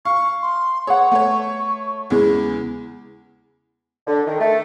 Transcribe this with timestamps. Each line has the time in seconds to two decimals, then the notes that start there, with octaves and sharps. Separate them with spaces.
0.05 F5 C#6
0.42 C6
0.87 G#4 B4 C#5 F#5 C#6
1.12 A3 C#5
2.10 E2 C#3 G#3 E4
4.07 D3
4.26 D#3
4.39 A3